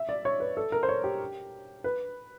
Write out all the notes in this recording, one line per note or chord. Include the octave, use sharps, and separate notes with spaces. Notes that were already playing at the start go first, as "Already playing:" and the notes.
Already playing: E5
D5
C#5
B4
A4
A#4
C5
C#5
G4
B4